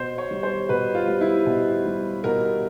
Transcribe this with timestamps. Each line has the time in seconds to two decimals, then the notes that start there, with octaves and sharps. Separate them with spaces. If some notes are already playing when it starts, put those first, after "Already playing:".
Already playing: B2 C5
0.18 C#5
0.31 G3
0.43 C5
0.69 B2 B4
0.95 F4
1.07 G3
1.21 E4
1.46 B2
1.85 G3
2.24 B2 A#4